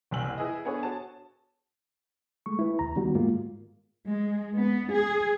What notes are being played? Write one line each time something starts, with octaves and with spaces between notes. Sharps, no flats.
F#1 C2 G5 G#5 E6 F#7
E4 G#4 B4 D#5
B3 D4 G#4 A4 B4 C#5
F#4 C#5 A5
G#3 A3 C#6
E4 B4
D#2 A#5
D#3 G3 B3 F#4
G#2 G#3 A#3 F4
G#3
B3
G#4